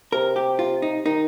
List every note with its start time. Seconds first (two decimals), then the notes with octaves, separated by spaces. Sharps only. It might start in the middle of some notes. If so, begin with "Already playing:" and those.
0.12 C3 A#4
0.36 G4
0.59 F4
0.82 D#4
1.05 D#3 D#4